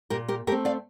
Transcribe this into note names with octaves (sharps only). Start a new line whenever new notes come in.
A#2 G4 A#4
G4 A#4
A3 C4 G4 A#4
D5 F5